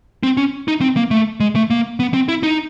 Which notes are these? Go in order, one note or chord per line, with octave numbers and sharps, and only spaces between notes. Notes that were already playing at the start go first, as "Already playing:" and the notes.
C4
C#4
D#4
C4
A#3
A3
G#3
A3
A#3
B3
C4
E4
D#4